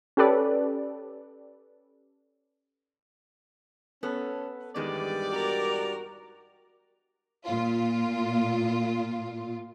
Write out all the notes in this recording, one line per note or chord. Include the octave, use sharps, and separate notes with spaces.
C#4 G4 A4 B4 D5
B3 C#4 A4
E2 G2 D#3 G#3 B3 G4 D5
F#4 A#4
A#2 F4